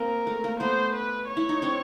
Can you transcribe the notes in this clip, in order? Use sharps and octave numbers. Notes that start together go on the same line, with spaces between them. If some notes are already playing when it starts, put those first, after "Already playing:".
Already playing: A#3 C4 A#4
A3
A#3
A3 B3 C5
B4
C#5
E4
D#4
C4 D4